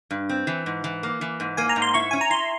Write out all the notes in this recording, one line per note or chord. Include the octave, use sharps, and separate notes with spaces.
G2
C4
E3
G#2
E3
A#3
E3
G#2
A#3 G#5
A#5
G#2
C6
E4 C#6
C#4 G#5
A#5
E4 C6